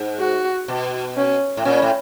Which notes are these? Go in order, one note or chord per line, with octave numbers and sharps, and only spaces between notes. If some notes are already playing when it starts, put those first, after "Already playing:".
Already playing: G#2
F#4
B2
C#4
A2
A#2 C#4
A2